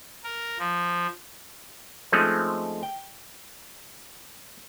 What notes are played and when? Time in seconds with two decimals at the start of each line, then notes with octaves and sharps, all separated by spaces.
0.24 A#4
0.59 F3
2.12 F3 G#3 A3 C4 C#4 D#4
2.83 G5